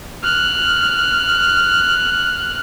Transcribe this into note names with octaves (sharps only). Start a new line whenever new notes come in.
F6 F#6